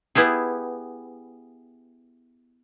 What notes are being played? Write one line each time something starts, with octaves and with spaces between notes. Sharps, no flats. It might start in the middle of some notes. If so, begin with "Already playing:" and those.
B3 E4 G4 G#4